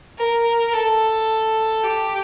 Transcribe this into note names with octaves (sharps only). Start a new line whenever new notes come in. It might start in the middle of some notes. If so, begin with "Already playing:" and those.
A#4
A4
G4